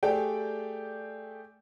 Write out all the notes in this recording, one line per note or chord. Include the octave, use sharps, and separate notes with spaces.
A3 G4 G#4 D5 G5